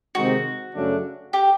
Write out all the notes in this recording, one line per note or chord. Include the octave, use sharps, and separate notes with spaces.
C3 D#3 G#3 C4 D#4 F#4
F#2 C#3 F#3 A3 D4
G4